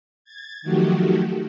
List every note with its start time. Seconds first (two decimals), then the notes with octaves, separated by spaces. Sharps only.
0.24 G#6 A6
0.62 D#3 F3 F#3 A3 F#4 G4